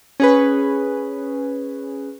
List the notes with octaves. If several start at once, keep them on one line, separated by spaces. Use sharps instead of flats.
C#4 G#4 B4